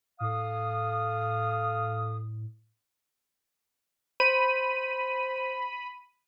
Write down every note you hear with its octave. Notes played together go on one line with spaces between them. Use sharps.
A2 A4 F5 D#6
C5 B5 D#7